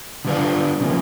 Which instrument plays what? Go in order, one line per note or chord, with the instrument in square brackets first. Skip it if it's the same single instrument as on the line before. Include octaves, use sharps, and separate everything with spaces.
[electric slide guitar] D3 G3 B3 D4 F4
C#3 F3 A#3